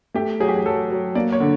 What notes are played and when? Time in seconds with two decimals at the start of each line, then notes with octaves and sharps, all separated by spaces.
0.14 A3 G4
0.40 F#3 G#4
0.48 G4
0.56 G#4
0.66 F#3 A4
0.90 F#3
1.15 A#3 D5
1.32 C#5
1.40 D3